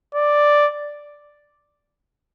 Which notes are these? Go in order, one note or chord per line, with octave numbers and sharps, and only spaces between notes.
D5